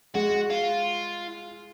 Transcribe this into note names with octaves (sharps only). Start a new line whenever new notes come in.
G#3 F#4
F4